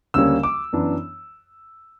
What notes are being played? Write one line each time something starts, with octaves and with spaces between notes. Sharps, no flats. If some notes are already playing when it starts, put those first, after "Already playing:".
D2 C#3 G3 A#3 C#4 E6
D6
F#2 E3 B3 D4